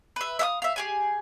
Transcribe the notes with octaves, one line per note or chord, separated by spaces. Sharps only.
B4 E5
E5 F5 D#6
E5 F5
G4 G#4 G#5